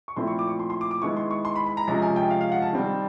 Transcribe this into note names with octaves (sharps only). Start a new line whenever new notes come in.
C#6
A#2 F3 A3 C4 E4 C6
C#6
D6
C#6
C6
C6
D6
D6
D#3 G#3 B3 E4 C#6
C6
C#6
C6
B5
B5
A#5
C3 F3 G#3 C#4 A#5
G#5
G5
F5
F5
F#5
A5
D#3 G3 C4